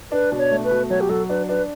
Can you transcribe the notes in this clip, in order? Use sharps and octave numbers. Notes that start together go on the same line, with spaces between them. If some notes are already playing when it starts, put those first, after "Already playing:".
D4 B4
B2
C#5
A3
B4
B2
F#3 C#5
G4
F#3 A4
D4 B4
D4 B4